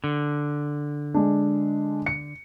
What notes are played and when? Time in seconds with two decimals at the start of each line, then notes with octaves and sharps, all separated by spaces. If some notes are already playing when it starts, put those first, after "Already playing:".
0.04 D3
1.14 G#3 D4
2.06 C#7